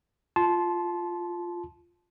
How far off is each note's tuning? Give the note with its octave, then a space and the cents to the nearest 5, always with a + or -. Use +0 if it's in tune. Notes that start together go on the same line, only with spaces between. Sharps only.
F4 +0 A5 -20 C6 +0